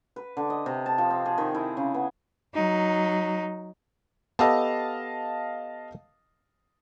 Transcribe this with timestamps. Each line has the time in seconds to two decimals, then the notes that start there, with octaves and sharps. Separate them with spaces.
0.16 B4
0.37 D3
0.50 D#5
0.66 C3
0.86 A5
0.98 F3
1.10 C4
1.26 G#4
1.38 D#3
1.54 E4
1.77 C#3
1.94 B3
2.54 F#3 D#4
4.39 B3 G4 A4 D#5 F5 A5